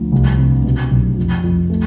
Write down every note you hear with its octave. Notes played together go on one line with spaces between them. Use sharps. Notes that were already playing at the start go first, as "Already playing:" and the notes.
Already playing: D2 F3
C2
C3
B2
B1
F2
F2
A3